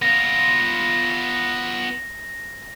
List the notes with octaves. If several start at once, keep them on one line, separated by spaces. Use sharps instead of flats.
B3 F4 A#6